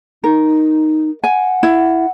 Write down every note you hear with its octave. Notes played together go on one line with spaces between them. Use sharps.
D#4 A#4
F#5 G#5
E4